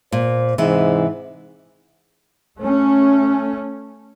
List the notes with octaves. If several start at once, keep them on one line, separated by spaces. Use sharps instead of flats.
A#2 C5
G#2 C3 E3
A3 C#4